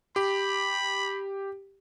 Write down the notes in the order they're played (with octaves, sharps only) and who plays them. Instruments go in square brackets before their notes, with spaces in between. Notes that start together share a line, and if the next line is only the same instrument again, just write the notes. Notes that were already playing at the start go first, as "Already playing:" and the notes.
[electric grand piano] G4 [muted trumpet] B5